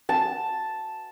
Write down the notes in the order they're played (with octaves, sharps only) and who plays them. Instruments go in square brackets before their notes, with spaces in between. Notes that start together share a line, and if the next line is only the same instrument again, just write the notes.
[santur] A5